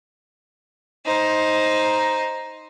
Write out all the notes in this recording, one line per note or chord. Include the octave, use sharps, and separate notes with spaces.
D#4 C5